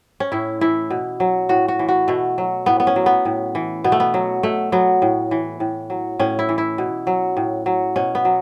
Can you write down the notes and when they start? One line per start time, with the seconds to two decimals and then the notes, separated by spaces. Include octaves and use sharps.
0.20 C#4
0.32 A2 E4
0.61 E3 E4
0.90 B2
1.20 F#3
1.49 A2 F#4
1.68 F#4
1.79 E3
1.88 F#4
2.08 B2 A3
2.38 F#3
2.66 A2 B3
2.80 B3
2.87 C#4
2.96 F#3
3.06 B3
3.25 A2
3.55 E3
3.84 B2 B3
3.92 A3
4.00 B3
4.14 F#3
4.43 B2 A3
4.72 F#3 B3
5.02 A2
5.31 E3
5.60 A2
5.90 F#3
6.19 A2 C#4
6.39 E4
6.49 E3
6.58 E4
6.78 B2
7.07 F#3
7.37 A2
7.66 F#3
7.96 B2 C#4
8.15 B3
8.25 F#3